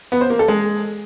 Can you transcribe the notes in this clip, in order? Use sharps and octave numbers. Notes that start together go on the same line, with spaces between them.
B3
C5
A#3
A4
G#3